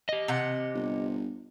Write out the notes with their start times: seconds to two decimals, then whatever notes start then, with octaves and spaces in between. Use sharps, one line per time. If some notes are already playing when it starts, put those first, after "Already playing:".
0.09 G4 D#5
0.28 C3 F#5
0.74 G1